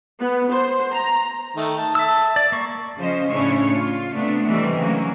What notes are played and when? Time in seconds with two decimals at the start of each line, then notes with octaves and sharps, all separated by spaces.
0.19 B3
0.51 C5
0.93 A#5
1.56 D#3 A3
1.78 A5
1.95 E5 A5 E6
2.36 D5
2.52 A#3 C#6
2.98 C#3 F3 C#4 C5 D#5
3.29 A2 C#3 C#4 D4 E4 C#5
3.72 F4
4.13 C3 A3 B3 D4
4.46 C3 D#3 E3 G3 A3 C4
4.80 C#3 F#3 A#3